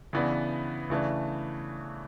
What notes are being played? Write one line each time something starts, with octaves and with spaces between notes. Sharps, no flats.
C#3 E3 B3 D4
C#3 E3 A3 D4